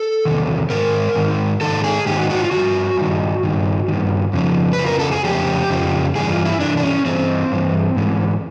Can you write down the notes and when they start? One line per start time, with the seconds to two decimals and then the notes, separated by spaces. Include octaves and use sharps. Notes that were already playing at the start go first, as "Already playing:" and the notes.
Already playing: A4
0.25 E2 C3 D#3
0.70 G#2 D#3 A#4
1.16 G#2 D#3
1.61 G#2 D#3 A4
1.84 G#4
2.06 G#2 D#3 G4
2.17 F#4
2.30 F#4
2.40 F4
2.51 D#3 F#4
2.57 G2
2.97 G2 D#3
3.43 G2 D#3
3.88 G2 D#3
4.33 F2 C#3 F3
4.73 B4
4.79 F2 C#3 F3
4.86 A#4
4.99 A4
5.11 G#4
5.24 F2 C#3 F3 G4
5.70 F2 C#3 F3
6.15 G2 E3 G#4
6.31 F4
6.45 E4
6.60 G2 E3 D4
6.77 D4
6.83 C#4
7.05 G2 E3 C4
7.52 G2 E3
7.96 G#2 E3